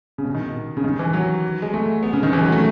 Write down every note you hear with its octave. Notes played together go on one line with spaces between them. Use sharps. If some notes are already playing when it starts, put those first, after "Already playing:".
C#3
B2
D#3
B2
C#3
D#3
E3
F#3
G#3
A3
B3
C#3
D#3
E3
F#3
A3